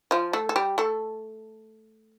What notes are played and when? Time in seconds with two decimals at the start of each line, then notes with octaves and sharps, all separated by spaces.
0.11 F3 F4
0.33 A3 A4
0.49 A4
0.56 G3 G4
0.78 A3 A4